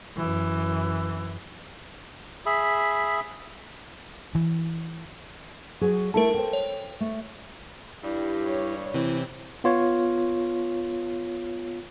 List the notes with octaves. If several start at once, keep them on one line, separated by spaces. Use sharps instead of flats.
F#2 E3
G#4 E5 B5
E3
F#3 F#4 G#4
A3 E4 A4 A#4 A5
C5 G5
C#5
A3
G2 G3 E4
C#5
C3 E3 C4 E4
B3 F4 C#5